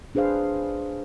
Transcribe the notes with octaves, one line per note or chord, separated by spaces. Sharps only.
D4 G#4 B4 C5 F5